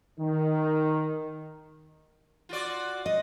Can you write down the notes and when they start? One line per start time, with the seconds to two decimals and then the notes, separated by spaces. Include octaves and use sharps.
0.20 D#3
2.49 F4 F#4 D5
3.06 D#5